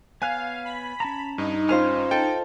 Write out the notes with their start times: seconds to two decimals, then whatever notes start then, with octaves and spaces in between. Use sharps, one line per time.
0.22 B3 C#5 F5 G#5 F#6
0.65 B5
1.00 C#4 A5 A#5
1.38 G2 D#4
1.69 C#4 F4 C5 G#5 F6
2.11 A4 G5